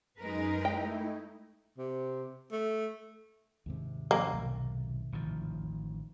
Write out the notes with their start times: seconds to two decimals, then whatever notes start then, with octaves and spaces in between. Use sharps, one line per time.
0.18 F#2 G#3 D#4 A#4 B4
0.65 A3 D#4 E4 G5
1.78 C3
2.52 A3
3.66 D#2 G#2 C3
4.11 F3 G3 A#3 C#4
4.33 B1
5.13 A1 D#3 F3